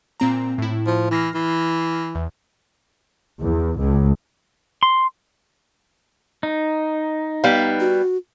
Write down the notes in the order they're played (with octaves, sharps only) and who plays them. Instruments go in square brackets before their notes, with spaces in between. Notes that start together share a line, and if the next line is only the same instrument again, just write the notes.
[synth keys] A#2 C4 A#5
A2 E4
[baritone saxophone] F3
[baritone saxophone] E3 [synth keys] F6 A#6 C7
[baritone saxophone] E3
[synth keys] E2
[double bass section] E2
C#2
[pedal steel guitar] C6
D#4
[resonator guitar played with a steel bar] G3 B3 F5
[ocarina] F#4